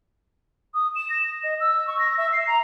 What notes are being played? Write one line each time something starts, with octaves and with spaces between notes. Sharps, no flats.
D#6
E7
A#6
D#5
E6
C#6
A#6
E5
C7
A#5